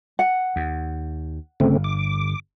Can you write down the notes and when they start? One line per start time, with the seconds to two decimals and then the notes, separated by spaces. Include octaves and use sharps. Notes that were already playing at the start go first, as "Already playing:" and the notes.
0.19 F#5
0.56 D#2
1.60 G1 C#3 A3 C4
1.84 D6